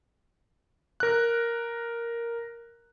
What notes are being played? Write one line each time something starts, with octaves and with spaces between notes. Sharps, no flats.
A#4 F#6